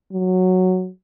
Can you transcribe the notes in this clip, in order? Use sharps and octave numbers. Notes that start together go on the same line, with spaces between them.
F#3